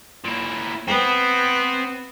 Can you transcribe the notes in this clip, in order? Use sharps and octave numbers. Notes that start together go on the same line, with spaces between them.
A#2 E4
B3 C4